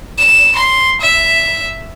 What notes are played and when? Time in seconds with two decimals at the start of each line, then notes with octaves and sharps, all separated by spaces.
0.19 E7
0.56 C6
1.01 E5